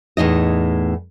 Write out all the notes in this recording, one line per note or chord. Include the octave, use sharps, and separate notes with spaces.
E2 A2 D#4 D#5